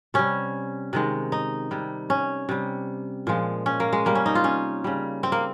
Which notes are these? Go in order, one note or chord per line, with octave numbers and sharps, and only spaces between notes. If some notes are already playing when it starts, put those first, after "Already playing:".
C3 G3 C#4
C3 D#3 G#3
D#4
C3 G3
C#4
C3 G3
A#2 F3 G#3
C#4
A#3
G#3
C3 G3 A#3
C#4
D#4
F4
C#4
C#3 G3
C4
A#3